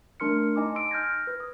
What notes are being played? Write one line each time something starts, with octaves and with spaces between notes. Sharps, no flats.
A3 D4 A#4 C6 F6 C#7
D#4 D#5 G#5 A5 C6 D6
C6 E6 D7
F6 G6 G#6 A#6
B4
D#6